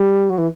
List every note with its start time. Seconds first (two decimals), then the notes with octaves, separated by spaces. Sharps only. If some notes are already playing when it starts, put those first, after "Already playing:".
Already playing: G3
0.30 F#3
0.38 E3